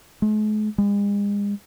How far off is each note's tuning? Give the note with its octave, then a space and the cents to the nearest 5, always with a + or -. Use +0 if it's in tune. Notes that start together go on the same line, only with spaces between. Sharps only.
G#3 +45
G#3 -40